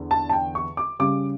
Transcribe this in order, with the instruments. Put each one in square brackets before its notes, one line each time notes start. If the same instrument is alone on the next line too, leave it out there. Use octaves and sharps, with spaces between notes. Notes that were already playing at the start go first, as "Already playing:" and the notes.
Already playing: [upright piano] E2 D3
A5
A5
G5
C#6
D6
C#3 G3 C#4 D6